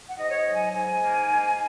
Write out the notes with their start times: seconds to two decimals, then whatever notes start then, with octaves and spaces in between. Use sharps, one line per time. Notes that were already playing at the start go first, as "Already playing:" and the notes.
0.09 F#5
0.18 G#2 D#5
0.29 C#5
0.36 D#5
0.46 F#3
0.55 G#5
0.74 G#2 G#5
1.03 A#3
1.30 G#2